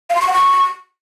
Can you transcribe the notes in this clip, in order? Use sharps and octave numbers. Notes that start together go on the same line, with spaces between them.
F5
C6
C#6
F#5
C#6